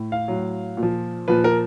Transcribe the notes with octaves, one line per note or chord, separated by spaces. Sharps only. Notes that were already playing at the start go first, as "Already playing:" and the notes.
Already playing: A2
F5
A2 F#3
A#2
F3
A#2 F3 B4
A#4